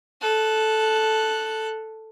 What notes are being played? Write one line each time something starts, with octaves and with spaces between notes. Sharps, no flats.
A4 F#6